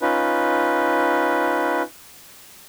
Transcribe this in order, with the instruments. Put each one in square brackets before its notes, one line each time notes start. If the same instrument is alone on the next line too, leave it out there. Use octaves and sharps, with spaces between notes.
[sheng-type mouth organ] C#4 D#4 F4 B4